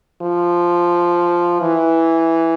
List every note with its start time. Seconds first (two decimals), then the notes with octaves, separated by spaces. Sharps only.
0.22 F3
1.61 E3